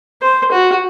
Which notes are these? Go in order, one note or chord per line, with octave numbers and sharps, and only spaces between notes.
C5
F#4